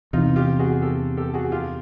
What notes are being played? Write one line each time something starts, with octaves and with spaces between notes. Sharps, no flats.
E2 C3 E3 D#4 F4
F4 G4
F#4 G#4
G4 A4
G4 A4
F#4 G#4
F4 G4